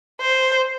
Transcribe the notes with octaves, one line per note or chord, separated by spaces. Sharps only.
C5